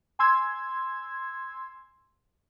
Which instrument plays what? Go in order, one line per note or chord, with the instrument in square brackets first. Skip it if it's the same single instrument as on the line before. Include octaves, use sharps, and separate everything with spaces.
[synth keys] G#5 C6 E6 G#6